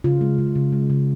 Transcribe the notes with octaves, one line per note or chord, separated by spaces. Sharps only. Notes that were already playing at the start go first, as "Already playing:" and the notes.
C#3 F4
G#3
C#3
C#3
G#3
C#3